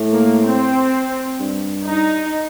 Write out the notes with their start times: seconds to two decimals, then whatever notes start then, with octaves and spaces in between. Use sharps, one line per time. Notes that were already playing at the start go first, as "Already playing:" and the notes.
Already playing: A2
0.13 A#3
0.44 C4
1.39 G2
1.86 D#4